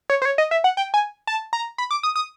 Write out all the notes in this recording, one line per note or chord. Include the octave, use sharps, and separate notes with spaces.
C#5
C5
C#5
D#5
E5
F#5
G5
G#5
A5
A#5
B5
D6
D#6
D#6